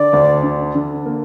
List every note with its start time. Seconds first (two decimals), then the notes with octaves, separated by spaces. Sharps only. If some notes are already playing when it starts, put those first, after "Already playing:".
Already playing: D3 D5
0.13 D2
0.43 D3
0.75 D3
1.06 A#3